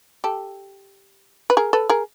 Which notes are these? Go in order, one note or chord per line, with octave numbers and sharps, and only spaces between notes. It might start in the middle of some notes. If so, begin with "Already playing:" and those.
G4 A4
B4
G#4 A#4
A4 B4
G#4 A#4